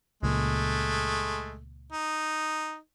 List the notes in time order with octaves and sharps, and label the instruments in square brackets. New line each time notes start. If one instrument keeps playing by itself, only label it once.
[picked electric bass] C#2 A#2 [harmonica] G#3 A3
[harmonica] D#4